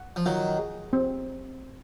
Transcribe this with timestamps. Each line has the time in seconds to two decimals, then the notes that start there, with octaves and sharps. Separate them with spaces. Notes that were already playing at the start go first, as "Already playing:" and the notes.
Already playing: F#5
0.16 F3
0.26 D#3 F#3 F4
0.59 G#4
0.93 C4